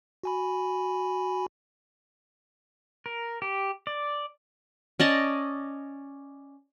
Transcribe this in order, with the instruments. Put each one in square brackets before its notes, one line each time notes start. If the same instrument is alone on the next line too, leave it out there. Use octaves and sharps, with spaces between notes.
[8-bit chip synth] F#4 G#5 B5
[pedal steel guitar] A#4
G4
D5
[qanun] C#4 D5 D#5 A5